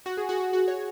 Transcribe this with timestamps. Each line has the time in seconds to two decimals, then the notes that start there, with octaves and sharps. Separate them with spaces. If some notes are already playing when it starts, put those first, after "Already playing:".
0.06 F#4
0.17 G#4
0.29 F#4
0.40 F#4
0.53 F#4
0.68 C#5